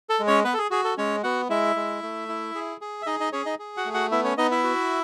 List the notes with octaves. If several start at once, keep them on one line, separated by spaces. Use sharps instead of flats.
A4
G#3
C#4 C#5
B3 B4
A4
G#4
F#4 G#4
A4
G#3 C#4 C#5
B3 F#4 F#5
G#3 E4 E5
G#3
A3
E4
G#4
G#4
E5
D#4 G#4 D#5
D#4 D#5
C#4 G#4 C#5
D#4 D#5
G#4
F#4 F#5
A3
F#4 F#5
B3 E4 E5
C#4 C#5
B3 D#4 D#5
E4 E5
F#4